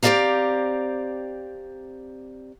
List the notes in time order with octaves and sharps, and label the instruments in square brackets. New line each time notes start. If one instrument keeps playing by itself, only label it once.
[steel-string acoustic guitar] C4 G4 G#4 D5 F5 A#5